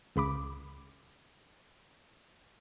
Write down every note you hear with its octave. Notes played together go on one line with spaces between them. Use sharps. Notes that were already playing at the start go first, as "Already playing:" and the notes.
C#2 C#3 B5 D6